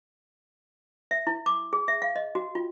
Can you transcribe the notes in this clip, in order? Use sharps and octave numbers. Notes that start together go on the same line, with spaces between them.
E5
E4
D6
G#4
E5
F5
D#5
F#4
F4